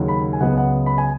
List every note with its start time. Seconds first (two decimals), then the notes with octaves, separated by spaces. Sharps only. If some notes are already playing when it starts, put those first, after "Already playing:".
Already playing: D#2 C#3 F#3
0.08 B5
0.33 G#5
0.41 C#2 C#3 F#3 B3 F#5
0.57 F#5
0.86 B5
0.98 G#5